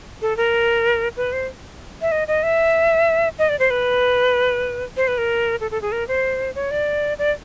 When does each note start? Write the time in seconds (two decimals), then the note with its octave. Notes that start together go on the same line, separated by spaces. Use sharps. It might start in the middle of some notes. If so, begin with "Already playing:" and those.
0.22 A4
0.37 A#4
1.17 B4
1.33 C5
2.02 E5
2.12 D#5
2.28 D#5
2.43 E5
3.39 D#5
3.49 D5
3.59 C5
3.70 B4
4.97 C5
5.08 B4
5.18 A#4
5.60 A4
5.71 A4
5.82 G#4
5.92 A#4
6.08 C5
6.55 C#5
6.71 D5
7.19 D5